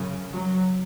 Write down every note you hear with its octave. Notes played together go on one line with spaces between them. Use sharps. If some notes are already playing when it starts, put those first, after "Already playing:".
Already playing: F#2 C#3
F#3